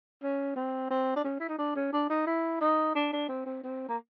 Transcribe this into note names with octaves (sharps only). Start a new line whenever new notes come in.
C#4
C4
C4
D4
C#4
E4
D#4
D4
C#4
D4
D#4
E4
D#4
D4
D4
C4
C4
C4
A#3